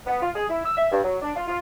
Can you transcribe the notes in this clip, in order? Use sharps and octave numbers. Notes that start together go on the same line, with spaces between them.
B3
F4
G#4
E4
E6
E5
G2
F#3
D4
F4
F4